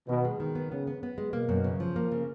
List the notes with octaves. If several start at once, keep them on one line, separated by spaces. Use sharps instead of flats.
B2 D#3
G#3
D#3
B3
C#3 B3
B3
B3
G#3
B2 A#3
F#2
C#3
F3
A#3
C#3